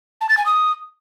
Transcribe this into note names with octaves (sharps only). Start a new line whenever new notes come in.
A5
A6
G#5
D#6